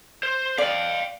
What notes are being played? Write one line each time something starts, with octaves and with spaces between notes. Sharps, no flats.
C5
D5 F5 G5